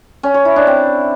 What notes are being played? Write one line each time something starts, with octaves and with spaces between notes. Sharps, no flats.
C#4
C#5
E4
D4
C4